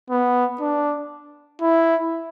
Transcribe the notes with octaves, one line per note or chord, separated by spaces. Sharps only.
B3
D4
E4